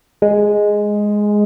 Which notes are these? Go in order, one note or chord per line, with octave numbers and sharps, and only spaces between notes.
G#3